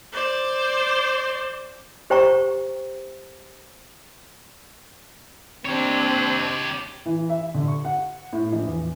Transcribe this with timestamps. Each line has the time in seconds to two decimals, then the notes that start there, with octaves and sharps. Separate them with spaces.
0.13 C5 D5
2.10 G4 C5 G5 A#5 C#6
5.65 C4 D4 G4 C#5
7.06 E3
7.29 E5
7.54 D3
7.68 C#6
7.85 F#5
8.33 A2
8.53 A#1
8.67 E2